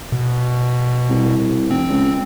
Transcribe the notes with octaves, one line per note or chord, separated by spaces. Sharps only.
B2
C2
F1 C4
C#2